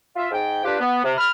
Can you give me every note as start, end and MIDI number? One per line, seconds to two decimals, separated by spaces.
0.16 0.28 65
0.16 0.28 76
0.32 0.64 44
0.32 0.64 79
0.64 0.77 62
0.64 0.77 65
0.64 0.77 67
0.64 0.77 71
0.80 1.01 59
1.04 1.12 48
1.18 1.30 83
1.18 1.30 89